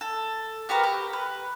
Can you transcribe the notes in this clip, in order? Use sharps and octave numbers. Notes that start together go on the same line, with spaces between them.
A4
F#4 G4 A#4 B4
G4
B4